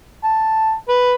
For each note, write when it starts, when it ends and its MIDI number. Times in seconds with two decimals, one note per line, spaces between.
0.24 0.73 81
0.89 1.14 71